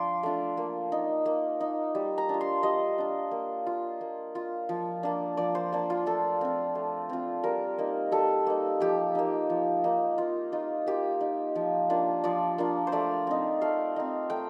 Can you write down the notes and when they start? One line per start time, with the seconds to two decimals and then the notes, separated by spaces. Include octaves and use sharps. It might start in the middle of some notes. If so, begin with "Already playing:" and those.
Already playing: F3 D4 F4 C6 D6
0.23 A3 D4 F4
0.57 A#3
0.92 D#4
1.26 A#3
1.61 D#4
1.95 G3
2.18 A#5
2.29 D4 F4
2.41 C6
2.63 G3 D#5
2.98 D4 F4
3.31 A#3
3.67 F4
4.01 A#3
4.35 F4
4.69 F3
5.03 A#3 D4
5.37 F3 D5
5.55 C5
5.72 A#3 D4
5.90 F4
6.06 A3 A4
6.41 C4 F4
6.75 A3
7.09 C4 F4
7.44 G3 A#4
7.78 A#3 D#4
8.12 G3 A4
8.47 A#3 D#4
8.80 F3 G4
9.15 A#3 D#4
9.50 F3
9.84 A#3 D#4
10.18 A#3 F4
10.52 D#4 F4
10.87 A#3 G4
11.21 D#4
11.55 F3
11.90 A#3 D4 F4
12.24 F3 D5
12.58 A#3 D4 F4
12.87 C5
12.92 A3 D5
13.27 C4 D#4
13.61 A3 F5
13.96 C4 D#4
14.30 A3 G5